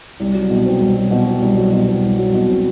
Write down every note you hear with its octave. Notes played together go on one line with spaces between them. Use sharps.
C2
F#3
B2
C4
C2
F#3
B2
C4
C2
F#3
B2
C4
C2
F#3
B2
C4